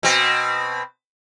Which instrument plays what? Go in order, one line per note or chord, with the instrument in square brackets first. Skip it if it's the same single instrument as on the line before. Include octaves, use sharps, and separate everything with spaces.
[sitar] B2 C4